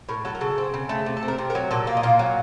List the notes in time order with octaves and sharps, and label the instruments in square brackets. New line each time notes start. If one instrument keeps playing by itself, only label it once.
[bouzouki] A2 A#4
F#3 A4
A#4
C#3 A4
C4
C#3
A3
C3
A4
C4
A#4
C3
A#4
F#3
A#2 A4
A#3
D#4
A#2 F4
F#3